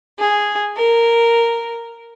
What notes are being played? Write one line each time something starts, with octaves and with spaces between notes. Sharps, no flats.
G#4
A#4